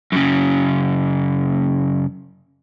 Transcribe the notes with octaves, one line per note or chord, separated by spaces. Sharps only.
F#2 C#3